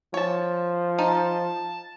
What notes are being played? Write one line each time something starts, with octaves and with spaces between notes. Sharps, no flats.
F3 C#5 A5
D#4 A5